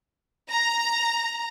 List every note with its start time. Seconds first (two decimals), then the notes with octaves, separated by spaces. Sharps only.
0.50 A#5